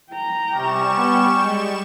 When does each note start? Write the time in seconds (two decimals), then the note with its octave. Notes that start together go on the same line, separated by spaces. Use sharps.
0.11 G5 A#5
0.51 C3 G3 C#4 G4 C#6 E7
0.95 B3 G5
1.41 G#3